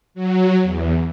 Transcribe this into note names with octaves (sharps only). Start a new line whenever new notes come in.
F#3
E2